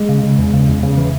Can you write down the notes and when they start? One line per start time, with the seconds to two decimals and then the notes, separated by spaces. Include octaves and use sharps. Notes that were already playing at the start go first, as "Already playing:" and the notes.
Already playing: G#3
0.09 C#3
0.23 C#3
0.38 E2
0.53 C#3
0.68 E2
0.83 C#3
0.97 E3